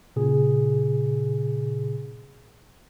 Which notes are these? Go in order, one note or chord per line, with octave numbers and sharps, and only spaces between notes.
A#2 C#3 G#4